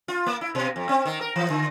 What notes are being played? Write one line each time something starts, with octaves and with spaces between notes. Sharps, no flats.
F4
A#3
E4
B2
F2
C4
D#3
A#4
E3
D3